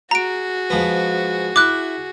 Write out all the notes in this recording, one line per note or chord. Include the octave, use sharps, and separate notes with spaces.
F#4 G#4 A#5 D7
G#2 F3 B3
E4 D6 F#6